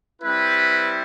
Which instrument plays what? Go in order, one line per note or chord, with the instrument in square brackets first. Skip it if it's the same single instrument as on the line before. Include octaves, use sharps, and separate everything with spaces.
[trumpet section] G3 C4 E4 B4